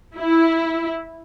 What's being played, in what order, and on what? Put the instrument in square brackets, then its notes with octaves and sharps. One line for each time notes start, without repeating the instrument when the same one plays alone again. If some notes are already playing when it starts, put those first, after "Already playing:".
[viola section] E4